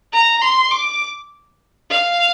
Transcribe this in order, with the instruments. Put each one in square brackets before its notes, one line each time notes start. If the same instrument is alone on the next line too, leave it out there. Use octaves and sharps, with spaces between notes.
[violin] A#5
C6
D6
F5